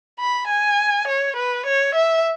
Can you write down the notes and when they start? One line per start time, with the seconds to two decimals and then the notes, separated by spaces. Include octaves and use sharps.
0.19 B5
0.48 G#5
1.08 C#5
1.36 B4
1.66 C#5
1.95 E5